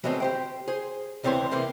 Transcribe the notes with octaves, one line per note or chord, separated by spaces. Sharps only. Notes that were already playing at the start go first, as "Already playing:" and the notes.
E3 F#3 G#3 A3 C4
G4 C5 G5
G#4 C5
D2 C3 E3 C4 C#5 C6
C3 E3 A#3 C4